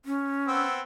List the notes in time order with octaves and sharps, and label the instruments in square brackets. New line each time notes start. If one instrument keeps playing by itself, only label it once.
[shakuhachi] C#4
[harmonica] B3 C4 E6